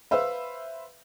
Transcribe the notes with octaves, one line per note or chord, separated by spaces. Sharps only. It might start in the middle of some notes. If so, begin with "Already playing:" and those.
B4 C5 E5 F5 E6